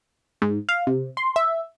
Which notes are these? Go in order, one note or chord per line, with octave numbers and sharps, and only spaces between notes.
G#2
F5
C3
C6
E5